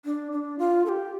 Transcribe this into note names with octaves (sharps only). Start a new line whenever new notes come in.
D4
D4
F4
A4
G4